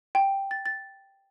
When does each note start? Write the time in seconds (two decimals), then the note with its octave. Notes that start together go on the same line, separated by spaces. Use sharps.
0.15 G5
0.51 A6
0.66 A6